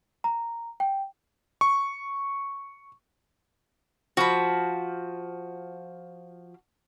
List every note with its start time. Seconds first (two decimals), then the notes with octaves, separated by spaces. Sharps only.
0.24 A#5
0.80 G5
1.61 C#6
4.17 F3 F#4 B5